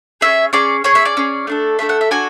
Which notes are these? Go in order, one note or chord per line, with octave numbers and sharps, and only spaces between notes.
C#4 G#4 E5
C#4 G#4 D5
C#4 G#4 C#5
E5
D5
C#4 G#4
A3 D4 A4
A3 D4 A4 E5
F#5
E5
D4 F#4 A4 G#5